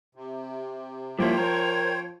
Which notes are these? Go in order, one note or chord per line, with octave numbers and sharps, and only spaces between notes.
C3
F3 G3 A#3 E4 C5 C#5 G5
A#4 G#6